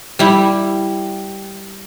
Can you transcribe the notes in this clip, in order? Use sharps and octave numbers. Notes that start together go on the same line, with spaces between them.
G3 E4